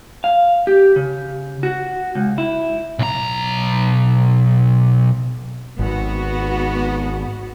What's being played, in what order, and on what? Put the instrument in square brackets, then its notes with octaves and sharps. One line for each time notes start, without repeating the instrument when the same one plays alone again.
[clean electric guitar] F5
G4
C#3
F#4
C#2
E4
[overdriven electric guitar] B1 A#5
[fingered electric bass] G#1 [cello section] B3 F#4